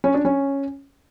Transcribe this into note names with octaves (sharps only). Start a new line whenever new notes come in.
C#4
D4
C#4